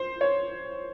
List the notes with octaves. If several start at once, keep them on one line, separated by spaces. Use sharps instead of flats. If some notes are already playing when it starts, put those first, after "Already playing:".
Already playing: C5
C#5